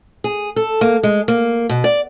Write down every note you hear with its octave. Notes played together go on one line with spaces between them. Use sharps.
G#4
A4
A#3
G#3
A#3
B2
D5